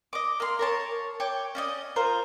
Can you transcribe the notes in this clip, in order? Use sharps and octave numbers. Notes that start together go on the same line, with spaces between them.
D#5 D6
A#3 C6
A#4 C#5 A5
C#5 G5 D6
C#4 D5 D#5
F4 A#4 C5